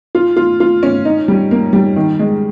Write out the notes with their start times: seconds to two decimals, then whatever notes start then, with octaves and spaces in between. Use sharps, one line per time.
0.15 F4
0.37 F4
0.60 F4
0.83 C#4
1.05 D#4
1.28 G3
1.51 A#3
1.73 G3
1.96 D#3
2.19 G#3